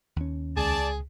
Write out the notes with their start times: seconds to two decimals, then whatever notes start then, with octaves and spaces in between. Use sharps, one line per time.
0.16 D#2 C#4
0.57 C#2 G#4 D5 A5